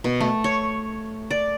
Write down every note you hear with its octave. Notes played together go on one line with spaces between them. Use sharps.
B2
A3
C#5
D5